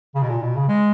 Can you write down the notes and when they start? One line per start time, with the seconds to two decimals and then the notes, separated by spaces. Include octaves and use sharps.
0.15 C#3
0.22 B2
0.30 A#2
0.43 B2
0.56 C#3
0.68 G#3